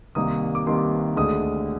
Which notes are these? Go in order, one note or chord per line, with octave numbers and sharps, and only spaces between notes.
C2 C3 D#3 A#3 D#6
D6
C2 C3 D#3 A#3 C6
D2 D3 G#3 D#6